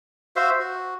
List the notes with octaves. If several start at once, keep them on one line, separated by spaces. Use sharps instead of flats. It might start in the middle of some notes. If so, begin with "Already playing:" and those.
F#4 C5 E5 F5
F#4